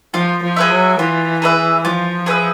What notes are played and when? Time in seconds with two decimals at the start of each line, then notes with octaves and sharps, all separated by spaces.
0.14 F3 F4
0.42 F3
0.56 G#4 B4 E5
0.70 F#3
0.99 E3 F4
1.42 G#4 B4 E5
1.83 F3 F4
2.26 G#4 B4 E5